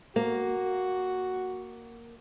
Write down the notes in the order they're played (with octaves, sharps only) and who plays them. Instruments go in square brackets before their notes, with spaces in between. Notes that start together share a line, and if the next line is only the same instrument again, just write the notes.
[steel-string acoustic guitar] A#3 [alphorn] F#4